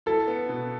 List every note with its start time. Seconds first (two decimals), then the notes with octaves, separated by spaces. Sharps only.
0.06 E4 A4
0.27 B3
0.49 B2